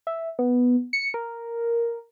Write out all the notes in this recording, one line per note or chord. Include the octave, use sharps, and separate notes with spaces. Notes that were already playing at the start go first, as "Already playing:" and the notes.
E5
B3
C#7
A#4